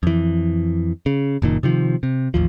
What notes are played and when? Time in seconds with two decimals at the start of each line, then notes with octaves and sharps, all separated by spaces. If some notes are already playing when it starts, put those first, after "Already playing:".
0.03 F2 E3
1.06 C#3
1.42 F#1 A#2 D#3
1.63 C3 D#3 F3
2.03 C3
2.34 A1 D#2 F3